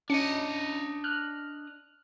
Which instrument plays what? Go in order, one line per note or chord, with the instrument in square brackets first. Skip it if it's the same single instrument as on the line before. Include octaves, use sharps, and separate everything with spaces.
[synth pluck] C#4 C#7 [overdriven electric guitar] D4 D#5
[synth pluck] F6 F#6